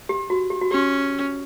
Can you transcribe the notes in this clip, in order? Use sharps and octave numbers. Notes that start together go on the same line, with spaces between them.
G4
F#4
G4
F#4
C#4 G4